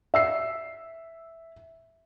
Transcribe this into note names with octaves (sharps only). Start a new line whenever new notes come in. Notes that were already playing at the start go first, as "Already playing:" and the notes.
E5 E6 C7